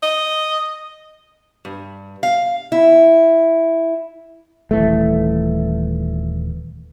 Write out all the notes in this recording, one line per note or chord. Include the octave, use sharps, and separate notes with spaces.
D#5
G2
F5
E4
D#1 E3 A3